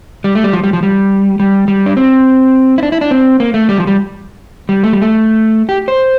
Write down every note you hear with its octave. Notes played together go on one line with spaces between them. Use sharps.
G3
A3
G3
F3
G3
F3
G3
G3
G3
D4
C4
E4
D4
E4
D4
C4
A#3
A3
G3
F3
G3
G3
A3
G3
A3
G4
C5